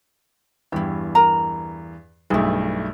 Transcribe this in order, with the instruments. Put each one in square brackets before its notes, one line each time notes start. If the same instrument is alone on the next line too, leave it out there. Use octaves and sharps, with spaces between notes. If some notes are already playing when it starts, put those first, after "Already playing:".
[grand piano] E2 G2 [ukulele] E4 G4
[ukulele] A#4 A#5
[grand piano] B1 G2 A3 [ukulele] E4 G#4